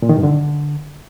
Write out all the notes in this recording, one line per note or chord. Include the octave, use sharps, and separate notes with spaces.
A#2
D#3
G2
D3